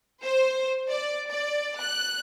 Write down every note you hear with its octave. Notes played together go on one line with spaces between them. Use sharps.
C5
D5
D5
F#6